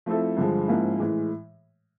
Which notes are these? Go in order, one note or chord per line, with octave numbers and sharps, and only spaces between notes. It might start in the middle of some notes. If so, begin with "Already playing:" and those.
F3 A3 C4 E4 A4
G2 D3 F3 G#3
G#2 F3 A#3 C#4 E4
A2 E3 G#3